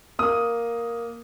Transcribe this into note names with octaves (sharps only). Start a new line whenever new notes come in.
A#3 D#6